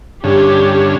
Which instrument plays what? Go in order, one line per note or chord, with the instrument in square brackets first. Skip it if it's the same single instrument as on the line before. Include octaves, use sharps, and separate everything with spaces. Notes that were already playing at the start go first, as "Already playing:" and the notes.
[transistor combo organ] G2 D3 C#4 [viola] G4